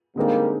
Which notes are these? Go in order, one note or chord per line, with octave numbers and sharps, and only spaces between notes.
D3 G3 G#3 A#3 C4 D#4 A#4